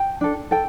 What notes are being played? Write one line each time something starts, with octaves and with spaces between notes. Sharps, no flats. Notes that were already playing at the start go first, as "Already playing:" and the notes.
Already playing: G5
D4 A4
A4 G5